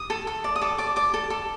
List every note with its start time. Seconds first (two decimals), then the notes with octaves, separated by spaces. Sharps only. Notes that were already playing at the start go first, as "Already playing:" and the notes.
Already playing: D#6
0.10 A4
0.27 A4
0.44 D5
0.56 D#6
0.61 A4 D6
0.78 D5 D6
0.96 D5 D6
1.14 A4
1.30 A4